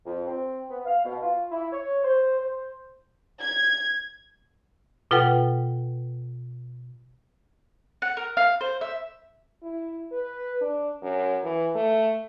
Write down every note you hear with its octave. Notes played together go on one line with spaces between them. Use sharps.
F2
C4
B3
F5
B2
F4
E4
C#5
C5
C5
G#6
B2 F4 A4 B4 F#5 G5
F#5
A#4
F5
C5
E5
E4
B4
D4
F#2
E3
A3